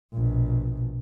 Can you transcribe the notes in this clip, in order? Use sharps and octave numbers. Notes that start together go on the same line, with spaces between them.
A#1 B2